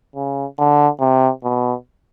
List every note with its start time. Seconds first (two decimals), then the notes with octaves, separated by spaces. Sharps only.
0.15 C#3
0.59 D3
1.00 C3
1.44 B2